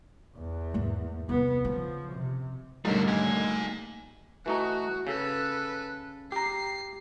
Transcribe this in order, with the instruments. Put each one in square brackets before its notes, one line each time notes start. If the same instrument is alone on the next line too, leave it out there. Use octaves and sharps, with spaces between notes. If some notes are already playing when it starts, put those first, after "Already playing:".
[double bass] E2
[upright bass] G#2 A#3
[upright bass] C2 F2 [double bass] B3
[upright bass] C#3 [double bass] F3
[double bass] C3
[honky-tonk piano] B1 G#2 D3 [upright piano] D#3 G3 [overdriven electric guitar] F3 A#4 [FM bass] A3
[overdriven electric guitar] A#3 G#5
[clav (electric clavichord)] E3 A3 D#4 [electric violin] F#4
[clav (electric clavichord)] C#3 [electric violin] A4 B4
[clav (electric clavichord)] G4 A#5 [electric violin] C7